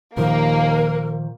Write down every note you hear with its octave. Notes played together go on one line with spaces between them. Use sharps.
D#2 A#2 D#3 F3 A#3 A#4